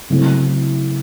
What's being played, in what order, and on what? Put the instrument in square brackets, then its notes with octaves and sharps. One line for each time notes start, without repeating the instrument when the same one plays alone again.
[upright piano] C#3 F#3 A3 C4 E4